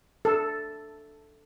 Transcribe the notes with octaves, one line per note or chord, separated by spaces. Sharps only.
A4